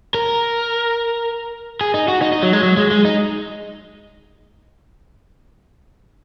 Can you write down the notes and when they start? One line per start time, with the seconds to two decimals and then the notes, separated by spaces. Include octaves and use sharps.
0.14 A#4
1.81 G#4
1.94 D#4
2.08 F#4
2.22 D#4
2.32 D#4
2.43 F#3
2.53 G#3
2.63 F#3
2.77 G#3
2.91 G#3
3.05 D#4